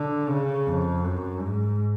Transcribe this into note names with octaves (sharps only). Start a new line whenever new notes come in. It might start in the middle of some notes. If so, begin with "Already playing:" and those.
Already playing: D3
C#3
F2
F#2
G#2